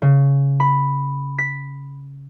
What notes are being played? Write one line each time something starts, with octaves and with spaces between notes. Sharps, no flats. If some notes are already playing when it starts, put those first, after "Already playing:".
C#3
B5
B6